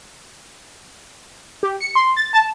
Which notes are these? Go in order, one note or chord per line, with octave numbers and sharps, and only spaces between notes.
G4
C#7
C6
A6
A5